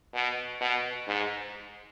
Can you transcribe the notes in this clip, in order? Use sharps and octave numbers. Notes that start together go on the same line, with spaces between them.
B2
B2
G#2